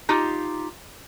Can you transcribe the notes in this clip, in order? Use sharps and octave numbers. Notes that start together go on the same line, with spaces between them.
D#4 F4 G4